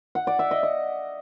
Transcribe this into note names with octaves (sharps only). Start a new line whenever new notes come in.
F#5
D5
E5
D#5
D#5